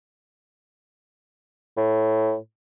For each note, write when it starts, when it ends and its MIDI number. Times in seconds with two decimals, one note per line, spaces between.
1.77 2.36 45